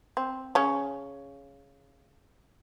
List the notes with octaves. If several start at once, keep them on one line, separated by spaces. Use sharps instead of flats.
C4
C#3 C#4